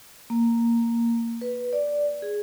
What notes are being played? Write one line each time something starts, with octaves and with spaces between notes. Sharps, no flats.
A#3
B4
D5
G#4